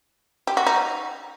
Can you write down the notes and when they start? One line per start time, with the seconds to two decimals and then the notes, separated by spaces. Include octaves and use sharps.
0.47 G4
0.57 F#4
0.67 D#4